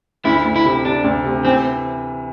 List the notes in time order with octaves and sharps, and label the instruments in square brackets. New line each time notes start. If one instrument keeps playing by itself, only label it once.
[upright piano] D2 [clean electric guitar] E4
[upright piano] D2
[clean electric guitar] E4
[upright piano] C3
[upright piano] C3 [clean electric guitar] D4
[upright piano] D2
C3
[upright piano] E3 [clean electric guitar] C4